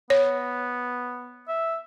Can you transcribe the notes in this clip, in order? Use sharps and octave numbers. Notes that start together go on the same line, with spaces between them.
B3 C#5
E5